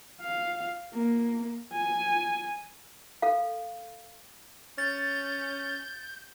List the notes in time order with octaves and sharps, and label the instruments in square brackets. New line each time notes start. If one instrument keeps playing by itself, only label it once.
[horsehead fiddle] F5
A#3
G#5
[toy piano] A4 F5
[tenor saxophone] C#4 [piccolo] G6 [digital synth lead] A6